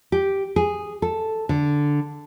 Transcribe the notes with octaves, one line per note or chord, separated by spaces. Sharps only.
G4
G#4
A4
D3